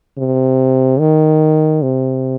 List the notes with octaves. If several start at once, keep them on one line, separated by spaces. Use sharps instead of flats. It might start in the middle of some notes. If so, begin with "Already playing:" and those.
C3
D#3
C3